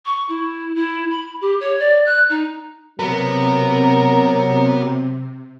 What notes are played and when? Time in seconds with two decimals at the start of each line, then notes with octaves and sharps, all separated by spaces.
0.05 C#6
0.28 E4
0.75 E4
1.10 B5
1.40 G4
1.60 C#5
1.79 D5
2.05 F#6
2.29 D#4
2.99 C3 F#3 B3 A#4 B4